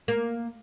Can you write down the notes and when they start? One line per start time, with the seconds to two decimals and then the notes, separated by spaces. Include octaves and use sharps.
0.08 A#3